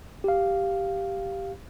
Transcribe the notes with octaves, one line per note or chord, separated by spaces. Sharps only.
G4 F5